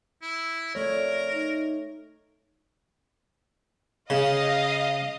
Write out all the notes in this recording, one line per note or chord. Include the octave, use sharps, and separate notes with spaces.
E4
F2 A3 A#4 C#5 D5
D#4
C#3 D#5 F5